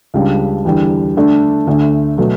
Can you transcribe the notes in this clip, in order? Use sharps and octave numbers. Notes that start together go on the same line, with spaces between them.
C#2 C#3 G3 D4
E2 D3 G3
D3 A3 D4
D2 D3 A3
B2 F#3 A3